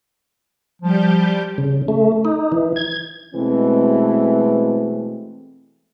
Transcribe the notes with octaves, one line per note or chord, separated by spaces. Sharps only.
F3 G3 G4 G6
C#3
A3
D#4
E3
G#6
B2 E3 G#3 A3 C4